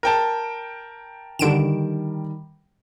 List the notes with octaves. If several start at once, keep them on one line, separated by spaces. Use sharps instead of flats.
A#4 G5 A5
D3 D#3 G3 D7 E7